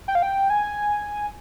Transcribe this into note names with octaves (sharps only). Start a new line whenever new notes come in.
G5
F5
G5
G#5